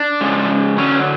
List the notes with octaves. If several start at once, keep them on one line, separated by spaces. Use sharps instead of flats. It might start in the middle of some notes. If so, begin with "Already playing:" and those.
Already playing: D4
C#3 F3 G#3
D3 F#3 C#4